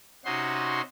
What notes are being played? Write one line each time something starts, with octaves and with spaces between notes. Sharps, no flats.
C3 C#4 D#4 F#4 C6